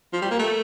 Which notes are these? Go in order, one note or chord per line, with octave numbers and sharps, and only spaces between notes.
F3
G3
A#3
A3